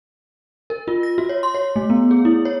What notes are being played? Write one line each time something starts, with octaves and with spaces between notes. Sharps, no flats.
A#4
F4
A#6
F#4
C#5
C6
C#5
A3
B3
G#4
E4
C#5